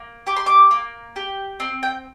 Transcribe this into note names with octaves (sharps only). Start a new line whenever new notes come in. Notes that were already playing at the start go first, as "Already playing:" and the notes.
Already playing: A#3
G4 D6
C6
D6
A#3
G4
C4 C6
G5